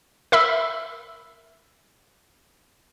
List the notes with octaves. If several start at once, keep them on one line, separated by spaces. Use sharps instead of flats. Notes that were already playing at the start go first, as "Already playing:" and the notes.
A#4 E5 B5 E6